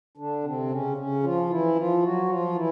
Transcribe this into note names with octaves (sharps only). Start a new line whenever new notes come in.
D3 D4
C3 C4
C#3 C#4
C#3 C#4
F3 F4
E3 E4
F3 F4
F#3 F#4
F3 F4
E3 E4